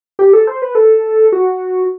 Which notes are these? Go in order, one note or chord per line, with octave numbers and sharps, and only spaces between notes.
G4
A4
C5
B4
A4
F#4